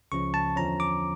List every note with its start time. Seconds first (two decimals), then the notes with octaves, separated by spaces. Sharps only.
0.12 C#2 C#3 F3 C#4 C#6
0.34 A5
0.56 E2 D3 F3 C#4 A#5
0.80 D6